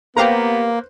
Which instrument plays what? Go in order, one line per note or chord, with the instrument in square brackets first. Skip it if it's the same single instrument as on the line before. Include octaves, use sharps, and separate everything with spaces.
[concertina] A#3 [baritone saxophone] B3 [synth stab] G4 F5 A#5 [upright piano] B4 C5